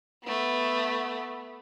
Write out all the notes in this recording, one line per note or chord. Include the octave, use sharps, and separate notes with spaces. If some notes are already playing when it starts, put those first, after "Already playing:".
A3 B3